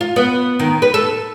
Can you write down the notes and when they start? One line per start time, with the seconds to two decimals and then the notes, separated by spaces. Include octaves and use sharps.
0.01 F4
0.16 B3
0.59 D#3
0.82 B4
0.94 A4